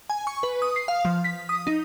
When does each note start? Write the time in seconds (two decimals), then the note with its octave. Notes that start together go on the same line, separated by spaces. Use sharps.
0.10 G#5
0.27 C#6
0.43 B4
0.62 D#6
0.76 C7
0.88 F5
1.05 F3
1.24 B6
1.49 D#6
1.67 D#4